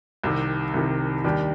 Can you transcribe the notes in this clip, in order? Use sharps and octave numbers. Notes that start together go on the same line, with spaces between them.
C2 C3 D#3
C2 C3 D#3
D#2 D#3 G3 D4 G4